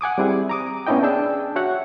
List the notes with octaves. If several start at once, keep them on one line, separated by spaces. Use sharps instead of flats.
F#5 G#5 D6 D#6
G3 C4 E4 G#4
A#5 D6 D#6
B3 C#4 D4 E4 D#5 G5
D4 G#4 G5 A5 E6
F#4 C#5 E5 F#5